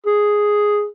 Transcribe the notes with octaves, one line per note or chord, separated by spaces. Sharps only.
G#4